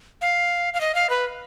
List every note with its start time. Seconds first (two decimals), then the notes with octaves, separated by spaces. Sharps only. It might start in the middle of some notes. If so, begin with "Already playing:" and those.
0.21 F5
0.74 F5
0.81 D#5
0.95 F5
1.10 B4